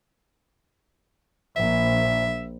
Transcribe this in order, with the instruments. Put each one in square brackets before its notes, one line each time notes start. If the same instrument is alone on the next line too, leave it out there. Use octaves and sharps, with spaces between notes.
[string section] A#1 [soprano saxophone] E5